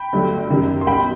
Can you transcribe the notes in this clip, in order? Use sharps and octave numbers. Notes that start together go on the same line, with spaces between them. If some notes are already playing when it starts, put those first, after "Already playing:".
Already playing: G5 B5
G1 G2 F#3 A3
F#2 D#3 G3
C6
B1 B2 G3 G5 B5